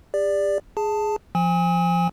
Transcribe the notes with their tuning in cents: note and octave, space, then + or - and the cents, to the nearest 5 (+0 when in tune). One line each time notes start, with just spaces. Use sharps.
G4 +45 D5 +0
G#4 +5 A5 +5
F3 +0 G#5 -30 D#6 +45